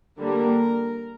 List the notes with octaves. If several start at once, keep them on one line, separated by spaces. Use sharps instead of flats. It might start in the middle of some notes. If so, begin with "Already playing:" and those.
D3 G3 A#3 A#4